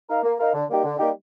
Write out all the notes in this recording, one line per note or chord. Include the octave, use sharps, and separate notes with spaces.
D#4 A#4 F5
A#3
D#4 A#4 F5
D3
G3 A#3 D#4 G4
D3
G3 A#3 D#4 G4